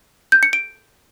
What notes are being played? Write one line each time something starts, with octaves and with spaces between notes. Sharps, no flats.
G6
C#7
D7